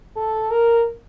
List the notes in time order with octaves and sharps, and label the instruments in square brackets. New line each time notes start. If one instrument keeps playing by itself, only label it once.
[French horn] A4
A#4